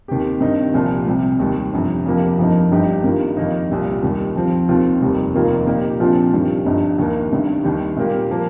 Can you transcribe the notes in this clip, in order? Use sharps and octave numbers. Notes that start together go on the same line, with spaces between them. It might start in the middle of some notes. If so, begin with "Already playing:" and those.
D#2 D#3 C4 G4
G2 D#3 C4 D#4
C2 A#2 F3
C2 C3 G3
D#2 D#3 G3
G1 F2 C3
F1 F2 F3 A#3 G4
G1 F2 F3 A#3 D#4
G1 G2 G3 D#4 G4
G2 D#3 A#3 F4
F2 D#3 A#3 D#4
C2 A#2 G3
D#2 D#3 G3
F2 F3 C4
D#2 D#3 C4 F4
F1 D#2 D#3 G3
F1 D#2 D#3 A#3 F4
A#2 A#3 D#4 G4
A#1 A#2 F3 C4 F4
G2 D#3 G3
G1 G2 F3 D#4
D#2 D#3 A#3
G1 G2 D#3
D#2 D#3 G3
A#2 G3 A#3 G4
F3 A#3 G4